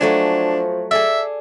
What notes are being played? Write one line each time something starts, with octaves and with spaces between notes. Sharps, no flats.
F3 F#3 A3 D4 G#5
G#4 A4 D5 E5